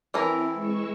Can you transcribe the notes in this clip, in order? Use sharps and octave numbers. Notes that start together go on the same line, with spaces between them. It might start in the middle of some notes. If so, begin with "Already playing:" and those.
E3 C4 E4 A4 A#4
G#3 C#6 E6